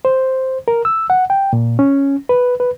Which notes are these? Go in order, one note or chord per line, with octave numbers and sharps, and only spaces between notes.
C5
A#4
E6
F#5
G5
A#2
C#4
B4
B4